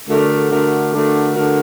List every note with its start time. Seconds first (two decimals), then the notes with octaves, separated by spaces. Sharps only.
0.08 D3 A3 D4 F#4 A#4
0.50 D3 A3 D4 F#4 A#4
0.92 D3 A3 D4 F#4 A#4
1.34 D3 A3 D4 F#4 A#4